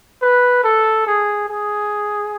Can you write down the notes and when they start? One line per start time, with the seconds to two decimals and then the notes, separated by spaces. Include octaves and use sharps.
0.22 B4
0.64 A4
1.07 G#4
1.49 G#4